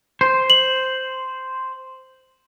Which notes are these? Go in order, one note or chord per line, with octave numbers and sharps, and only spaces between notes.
C5
F#7